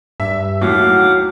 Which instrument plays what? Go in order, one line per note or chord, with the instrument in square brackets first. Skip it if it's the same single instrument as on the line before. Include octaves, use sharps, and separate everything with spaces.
[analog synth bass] G2 [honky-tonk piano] E5
[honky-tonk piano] D#2 A2 [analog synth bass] F#3 [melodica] F5 F#5 D6